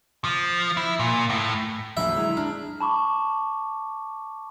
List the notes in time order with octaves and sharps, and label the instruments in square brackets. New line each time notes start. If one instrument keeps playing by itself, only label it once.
[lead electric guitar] F3
E4
A#2
A2
[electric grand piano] A#1 B5 [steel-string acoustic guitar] E2 D3 F#3 [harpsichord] E5
[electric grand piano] G#3 E4 G#4 [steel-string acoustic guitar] A#5
[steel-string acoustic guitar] D4 [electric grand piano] A#5 F6
[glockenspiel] A5 B5 C#6 D6